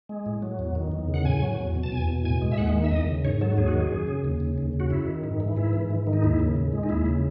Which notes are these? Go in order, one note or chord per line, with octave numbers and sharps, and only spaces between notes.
G#3
A2
F#3
E2
D#3
E2
C#3
F#5
A2 G#5
F#3
E2
B2
A5
E2 G#5
B2
A2 G#5
G#3
E5
D#2 F#5
D#3
E5
E2 D#5
C#3
G#2 C#5
F#3 A4
D#2 G#4
F#4
D#3
G#4
F#2
C#3
D#2
C#3
D#2
C#3
F#4
F#2 E4
D#3
G#2
E3
G#2 E4
E3
G#2
D#3
D#4
D#2 E4
C#3
A2
G#3
D#4
D#2 E4
C#3